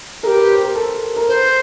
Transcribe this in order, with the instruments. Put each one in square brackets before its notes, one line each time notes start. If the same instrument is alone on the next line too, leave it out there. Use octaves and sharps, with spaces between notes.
[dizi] G4 A4 [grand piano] A#4
[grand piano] B4
C5
A#4
A4
A#4
[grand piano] B4 [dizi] C5